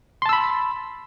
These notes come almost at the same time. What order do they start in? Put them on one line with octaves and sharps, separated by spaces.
C6 A5 E6 B5